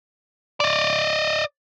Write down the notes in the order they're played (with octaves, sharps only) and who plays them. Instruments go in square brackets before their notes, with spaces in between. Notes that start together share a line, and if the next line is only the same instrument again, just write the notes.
[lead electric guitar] D5 D#5